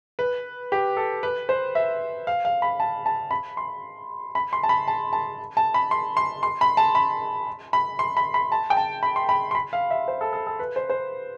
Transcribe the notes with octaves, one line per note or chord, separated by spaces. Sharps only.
B4
G4
A4
B4
C5
E5
F5
F5
B5
A5
A5
B5
C6
B5
C6
A5
B5
A5
A5
A5
B5
C6
C6
C6
B5
A5
B5
B5
C6
B5
B5
A5
G5
A5
B5
C6
B5
C6
B5
F5
E5
C5
A4
A4
A4
B4
C5
C5